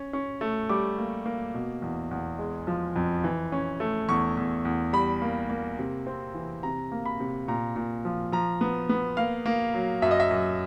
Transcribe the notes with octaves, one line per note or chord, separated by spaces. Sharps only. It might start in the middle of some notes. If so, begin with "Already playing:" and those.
Already playing: C#4
C#4
A3
G3 D6
A#3
A#3
B2
E2
E2
G#3
F3
F2
E3
C#4
A3
E2 C#6
E2
E2
G3 B5
A#3
A#3
C3
C4
E3
C3 A#5
A#3
B5
C3
A#2 A#5
A#2
F3
F3 A#5
B3
B3
A#3 F5
A#3
F#3
F#2 E5
D#5
E5
F#2